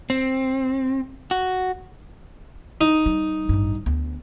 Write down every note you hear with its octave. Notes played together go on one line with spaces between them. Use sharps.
C4
F#4
D#4
G3
A1 G2
D2 B3